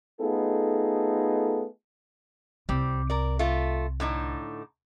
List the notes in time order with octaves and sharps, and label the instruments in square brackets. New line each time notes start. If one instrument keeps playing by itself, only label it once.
[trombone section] A3 B3 D#4 F4 G#4 A4
[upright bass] C2 [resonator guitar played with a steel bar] G3 C4
[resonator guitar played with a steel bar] A#4 D5
A3 F4
A2 D3 D#4